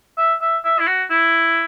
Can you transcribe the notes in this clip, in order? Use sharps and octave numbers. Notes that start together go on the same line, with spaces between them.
E5
E5
E5
E4
F#4
E4